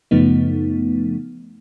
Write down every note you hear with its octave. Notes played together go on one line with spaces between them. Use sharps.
F#2 C#3 F3 A3 B3 D#4